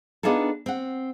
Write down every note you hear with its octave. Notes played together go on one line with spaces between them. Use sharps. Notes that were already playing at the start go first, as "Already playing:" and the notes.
B3 D4 D#4 F4 G#4 A4
C4 F#5